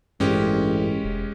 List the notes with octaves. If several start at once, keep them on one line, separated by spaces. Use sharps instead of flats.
A1 G2 G#3 C#4 G4
E1